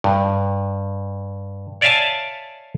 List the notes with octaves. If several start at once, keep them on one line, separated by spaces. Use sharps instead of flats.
G2
C#5 D5 E5 F5 G#5 A5